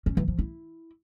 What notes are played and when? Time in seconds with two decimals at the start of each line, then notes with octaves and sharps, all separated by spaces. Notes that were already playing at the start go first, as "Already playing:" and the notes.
0.06 C#4
0.17 E3
0.28 F3
0.39 E4